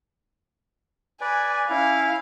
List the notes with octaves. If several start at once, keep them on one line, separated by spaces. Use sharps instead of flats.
B4 D5 G#5
C#4 E4 F5